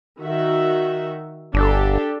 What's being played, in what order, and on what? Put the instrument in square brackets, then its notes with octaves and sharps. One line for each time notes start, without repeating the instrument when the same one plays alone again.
[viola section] D#3 F#4 E5
[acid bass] G1 [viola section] D4 G4 A4